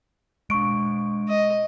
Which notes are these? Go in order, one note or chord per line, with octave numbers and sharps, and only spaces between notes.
G#3 D4 C#6 D7
D#5